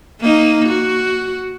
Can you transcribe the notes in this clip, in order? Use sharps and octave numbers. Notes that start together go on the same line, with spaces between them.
A#3 D#4
F#4